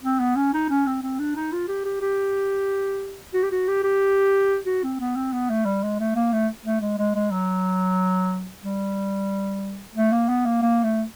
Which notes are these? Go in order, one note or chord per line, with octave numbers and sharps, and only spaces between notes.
C4
B3
C#4
D#4
C#4
C4
C4
D4
D#4
F4
G4
G4
G4
F#4
G4
F#4
G4
G4
F#4
C4
B3
C4
B3
A3
G3
G#3
A3
A#3
A3
A3
G#3
G#3
G#3
F#3
G3
A3
A#3
B3
A#3
A#3
A3